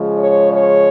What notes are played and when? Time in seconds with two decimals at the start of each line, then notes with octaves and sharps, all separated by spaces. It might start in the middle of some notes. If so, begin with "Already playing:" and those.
Already playing: C#3 F3 G#3
0.19 C#5
0.53 C#5